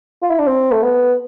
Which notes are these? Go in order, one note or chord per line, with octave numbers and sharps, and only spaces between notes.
F4
E4
D4
C4
A3
B3